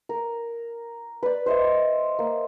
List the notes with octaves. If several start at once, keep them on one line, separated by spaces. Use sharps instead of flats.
A#4
B4 D5
C5 D#5 E5
A#3